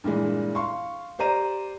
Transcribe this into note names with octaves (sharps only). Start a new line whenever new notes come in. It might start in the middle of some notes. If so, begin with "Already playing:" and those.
G2 A#2 E3 G#3
F5 C6 C#6
G4 C5 D5 A#5 D#7